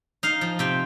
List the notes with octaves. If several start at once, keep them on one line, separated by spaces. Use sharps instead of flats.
D#4 F5
F3
C3 G5